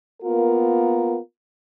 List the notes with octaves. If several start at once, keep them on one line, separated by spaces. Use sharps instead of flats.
A#3 B3 F4 A#4